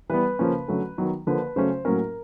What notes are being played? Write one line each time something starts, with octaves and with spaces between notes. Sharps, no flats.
E3 G3 B3 B4
C#3 F3 A#3 C#4
D3 F#3 A3 C#4
D#3 F#3 B3
D3 F3 A#3 B4
C#3 F#3 A3 C#4 C5
A2 F#3 A#3 C#4 A#4